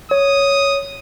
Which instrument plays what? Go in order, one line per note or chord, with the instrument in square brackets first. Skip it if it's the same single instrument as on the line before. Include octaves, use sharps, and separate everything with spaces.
[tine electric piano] C#5 [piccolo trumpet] D#6